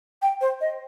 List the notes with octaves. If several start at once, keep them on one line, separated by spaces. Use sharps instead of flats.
G5
C5
D#5